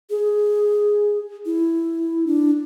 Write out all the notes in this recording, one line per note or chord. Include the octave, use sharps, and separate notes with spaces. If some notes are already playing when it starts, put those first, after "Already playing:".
G#4
E4
D4